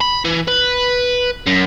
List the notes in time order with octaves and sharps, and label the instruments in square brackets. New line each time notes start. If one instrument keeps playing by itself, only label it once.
[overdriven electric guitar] B5
E3
B4
F#2